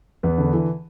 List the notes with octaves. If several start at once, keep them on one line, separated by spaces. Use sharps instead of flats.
E2 B4
D3
E3